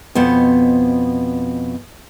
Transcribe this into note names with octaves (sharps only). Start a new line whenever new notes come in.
F2 B2 B3 C5